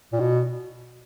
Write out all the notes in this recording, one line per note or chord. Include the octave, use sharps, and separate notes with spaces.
A#2
B2